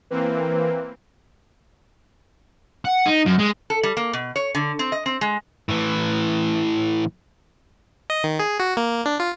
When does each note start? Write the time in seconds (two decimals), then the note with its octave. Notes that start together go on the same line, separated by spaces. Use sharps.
0.10 E3 A#3 C4 B4
2.85 F#5
3.06 D#4
3.26 F#2
3.39 G#3
3.70 A4
3.83 G3
3.97 A#3
4.13 B2
4.36 C#5
4.55 D3
4.79 C4
4.92 D#5
5.06 C4
5.21 G#3
5.69 A2 E3
8.10 D#5
8.24 D#3
8.39 G#4
8.60 F#4
8.77 A#3
9.06 D4
9.20 F4